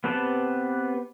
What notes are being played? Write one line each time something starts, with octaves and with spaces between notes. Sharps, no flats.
B3 C4 G4 B4 A5